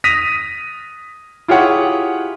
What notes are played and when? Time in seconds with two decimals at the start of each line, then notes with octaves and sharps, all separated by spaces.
0.04 D#6 A#6 B6 D#7 F7
1.48 E4 F4 G4 G#4 C#5 F#5